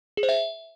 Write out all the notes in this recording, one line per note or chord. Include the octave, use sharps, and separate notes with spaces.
G#4
C5
E5